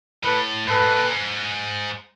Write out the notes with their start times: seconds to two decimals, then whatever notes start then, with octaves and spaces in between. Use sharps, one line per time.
0.23 A2 A4 B4
0.67 G#2 A4 B4
0.82 G#2
0.97 A#2
1.10 G#2